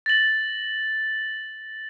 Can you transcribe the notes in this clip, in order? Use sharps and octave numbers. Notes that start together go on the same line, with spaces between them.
A6 A#6 F#7